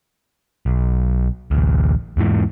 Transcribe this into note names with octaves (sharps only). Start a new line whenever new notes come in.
B1
A1 D2
E2 G#2 E3